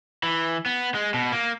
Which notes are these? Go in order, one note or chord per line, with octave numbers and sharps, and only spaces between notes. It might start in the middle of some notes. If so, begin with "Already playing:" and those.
E3
B3
G#3
B2
A#3